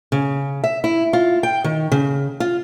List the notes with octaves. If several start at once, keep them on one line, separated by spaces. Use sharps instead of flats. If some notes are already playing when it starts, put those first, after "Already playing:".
C#3
E5
E4
F4
G5
D#3
C#3
F4